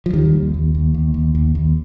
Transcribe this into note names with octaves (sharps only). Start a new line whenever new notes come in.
F3
D#2 D#3 G3
D#2
D#2
D#2
D#2
D#2
D#2
D#2